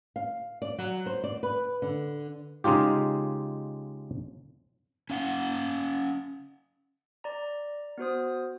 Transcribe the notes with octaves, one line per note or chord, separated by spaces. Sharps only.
F5
D5
F#3
C5
D5
B4
D3
C#3 G#3 D#4 F4 G4
C#4 F5 F#5
D5 A#5
B3 F#4 C5 D#6